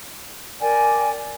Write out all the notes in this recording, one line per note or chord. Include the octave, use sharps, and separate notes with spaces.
A#4 D5 G5 G#5